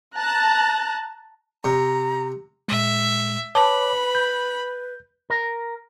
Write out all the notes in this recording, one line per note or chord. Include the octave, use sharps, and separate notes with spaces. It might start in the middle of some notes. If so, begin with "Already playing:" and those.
A5 A#5 F#6
C3 A#5
A#2 G#3 E5
B4 C#5 A5 B5 D6
G6
A#4